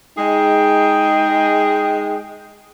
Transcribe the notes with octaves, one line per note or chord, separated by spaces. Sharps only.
G#3 D#4 G#4 D#5 G5